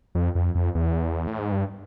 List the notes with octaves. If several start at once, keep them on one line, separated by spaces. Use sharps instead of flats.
F2
F2
F2
E2
A2
G#2
G2